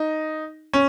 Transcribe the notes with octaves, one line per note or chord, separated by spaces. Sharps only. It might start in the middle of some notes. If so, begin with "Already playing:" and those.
Already playing: D#4
C#4